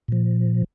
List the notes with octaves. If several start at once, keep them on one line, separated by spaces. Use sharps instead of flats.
A#2 F3